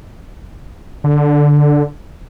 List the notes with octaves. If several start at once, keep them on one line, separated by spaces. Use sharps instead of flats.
D3